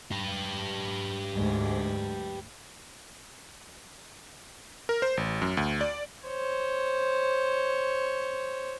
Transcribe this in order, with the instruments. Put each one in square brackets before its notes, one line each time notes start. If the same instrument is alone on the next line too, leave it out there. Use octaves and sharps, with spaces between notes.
[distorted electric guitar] G4 B4
[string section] D2 G#2
[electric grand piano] A#4
C5
A1
F#2
D2
D5
[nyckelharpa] C5 C#5